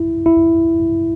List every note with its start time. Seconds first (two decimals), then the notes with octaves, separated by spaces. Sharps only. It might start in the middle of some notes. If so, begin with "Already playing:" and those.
Already playing: E4
0.26 E4